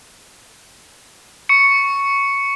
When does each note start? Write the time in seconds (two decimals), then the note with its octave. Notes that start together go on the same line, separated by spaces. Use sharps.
1.49 C#6 C#7